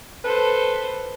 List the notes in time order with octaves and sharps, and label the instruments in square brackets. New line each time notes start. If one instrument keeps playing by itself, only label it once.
[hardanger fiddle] A4 C5 [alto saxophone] B4